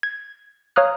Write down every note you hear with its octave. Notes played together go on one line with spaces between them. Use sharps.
G#6
C#5 F5 A#5 D#6 F6 F#6